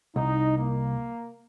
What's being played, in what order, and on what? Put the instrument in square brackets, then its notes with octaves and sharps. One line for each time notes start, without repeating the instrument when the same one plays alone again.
[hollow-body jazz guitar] C2 [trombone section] D#4
[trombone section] A#3